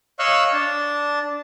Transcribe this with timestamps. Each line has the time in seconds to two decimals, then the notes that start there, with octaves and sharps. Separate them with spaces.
0.19 C#5 D#5 F5 C#6 E6 F#6
0.53 D4 A5